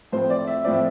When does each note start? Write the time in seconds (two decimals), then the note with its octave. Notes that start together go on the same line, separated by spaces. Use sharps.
0.12 A2 F3 C4 C5
0.30 D5
0.47 E5
0.65 A2 F3 C4 D5
0.73 E5